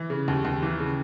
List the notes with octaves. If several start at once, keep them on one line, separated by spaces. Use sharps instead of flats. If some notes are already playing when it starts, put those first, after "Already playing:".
Already playing: E3
C#3
D#2
D#2
E3
C#3